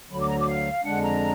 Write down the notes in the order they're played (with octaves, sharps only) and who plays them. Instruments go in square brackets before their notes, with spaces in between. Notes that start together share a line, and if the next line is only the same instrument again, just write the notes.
[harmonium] D2 D3 F#3 [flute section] B5
[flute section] D6
A#5
D6
F5
[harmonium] F2 D3 G#3 D4 [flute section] F#5
[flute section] A#5